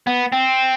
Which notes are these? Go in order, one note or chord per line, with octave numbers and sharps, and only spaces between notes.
B3
C4